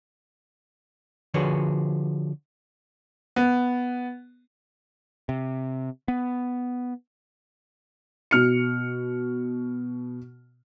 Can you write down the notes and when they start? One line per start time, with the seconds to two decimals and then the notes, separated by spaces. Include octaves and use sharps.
1.34 D3 F3 F#4 G#4 B4 C#5
3.36 B3
5.29 C3
6.08 B3
8.31 B2 F6 C#7